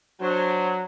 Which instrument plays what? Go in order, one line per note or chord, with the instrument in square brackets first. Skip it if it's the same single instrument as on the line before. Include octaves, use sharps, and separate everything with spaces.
[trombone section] F#3 [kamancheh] D4 C5